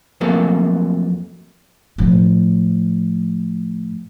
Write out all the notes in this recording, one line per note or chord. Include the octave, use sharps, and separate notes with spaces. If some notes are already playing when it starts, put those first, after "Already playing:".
F2 F#3 A3 A#3
A2 F3